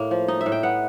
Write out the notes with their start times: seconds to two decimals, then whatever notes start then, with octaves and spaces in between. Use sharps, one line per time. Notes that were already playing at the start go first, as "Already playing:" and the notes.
Already playing: A2 A#3
0.11 F3
0.28 D#4 D#5
0.41 E5
0.46 A2
0.52 G5
0.63 B3 F#5